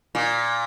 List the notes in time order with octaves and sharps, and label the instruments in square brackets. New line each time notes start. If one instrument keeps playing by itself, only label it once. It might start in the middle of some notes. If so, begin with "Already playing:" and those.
[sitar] A#2